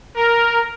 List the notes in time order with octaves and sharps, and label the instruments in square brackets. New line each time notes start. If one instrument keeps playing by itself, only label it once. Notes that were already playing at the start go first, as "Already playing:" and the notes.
[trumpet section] A#4